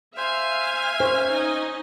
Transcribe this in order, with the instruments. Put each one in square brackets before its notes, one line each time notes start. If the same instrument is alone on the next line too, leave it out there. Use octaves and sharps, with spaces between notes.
[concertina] C5 [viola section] E5 F5 [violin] G#5
[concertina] C#4 [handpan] C5
[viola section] D#4 D#5